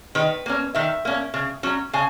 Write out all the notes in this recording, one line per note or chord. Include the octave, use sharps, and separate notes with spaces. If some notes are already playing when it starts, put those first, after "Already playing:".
D#3 B4
A#3 C#4
D#3 E5
A#3 C#4
C#3
F#3 C#4
C#3 G#5